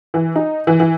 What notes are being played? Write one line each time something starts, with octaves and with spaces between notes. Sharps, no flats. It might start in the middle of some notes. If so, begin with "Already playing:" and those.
E3
D#4
E3
E3